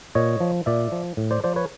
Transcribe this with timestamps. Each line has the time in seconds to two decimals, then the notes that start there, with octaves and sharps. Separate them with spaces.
0.15 A#2 C#5 D#5
0.40 F3
0.66 A#2 D5 E5
0.92 F3
1.17 A2
1.31 C5 D5
1.44 F3 C5 D5
1.56 B4 C#5